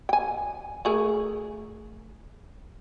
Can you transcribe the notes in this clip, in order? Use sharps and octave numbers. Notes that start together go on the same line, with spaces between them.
G5 G#5
A3 G#4 A#4